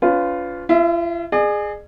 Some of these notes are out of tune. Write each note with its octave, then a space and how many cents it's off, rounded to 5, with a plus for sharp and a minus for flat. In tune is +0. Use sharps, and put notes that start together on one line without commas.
C#4 +40 F4 +0 B4 +30
F4 -45 E5 -5
G#4 +0 D5 +45